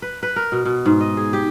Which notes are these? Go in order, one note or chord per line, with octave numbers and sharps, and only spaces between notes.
B4
B4
A#4
B2
B2
G#2
D#5
G#4
G4